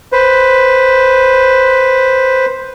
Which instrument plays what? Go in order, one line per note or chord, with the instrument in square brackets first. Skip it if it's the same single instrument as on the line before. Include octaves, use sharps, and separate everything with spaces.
[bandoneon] B4 C5